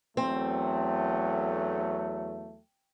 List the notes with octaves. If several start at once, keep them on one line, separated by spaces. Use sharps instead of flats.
E2 F#3 A3 C4